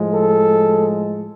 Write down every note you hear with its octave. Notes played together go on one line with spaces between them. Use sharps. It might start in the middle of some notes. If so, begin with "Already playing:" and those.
Already playing: A2 F3 G#3
A4